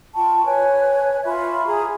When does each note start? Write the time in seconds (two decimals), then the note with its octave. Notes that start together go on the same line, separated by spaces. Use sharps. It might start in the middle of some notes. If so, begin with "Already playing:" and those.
0.15 F4 G5 A5 C#6
0.45 B4 C#5 G#5
1.24 F4 E5 B5 C#6
1.66 G#4 G#5 A#5 D#6